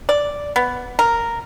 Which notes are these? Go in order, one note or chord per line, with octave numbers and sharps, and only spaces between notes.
D5
B3
A#4